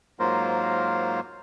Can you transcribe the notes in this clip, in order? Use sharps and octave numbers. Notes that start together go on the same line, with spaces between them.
G#2 F#3 A#3 F4 A#4 C5